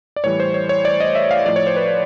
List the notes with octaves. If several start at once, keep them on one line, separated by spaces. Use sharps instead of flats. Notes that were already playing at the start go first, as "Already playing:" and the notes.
D5
A2 E3 G3 C#5
C5
C#5
C#5
D5
D#5
E5
F5
A2 F3 D5
C#5
C5
B4